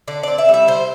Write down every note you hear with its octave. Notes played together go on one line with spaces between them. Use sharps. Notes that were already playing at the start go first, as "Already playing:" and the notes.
D3 D5
C4 D5
E5
G3
E5
D3 C5